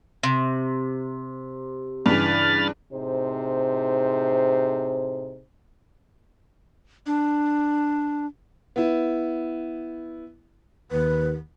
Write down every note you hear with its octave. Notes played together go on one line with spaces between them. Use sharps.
C3
G2 C#3 E3 B5 F6 A6
A2 C3 D#4 G#4 C5
D4
B3 E4
D#2 B4